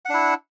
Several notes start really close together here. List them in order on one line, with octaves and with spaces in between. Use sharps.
F#5 D4 E4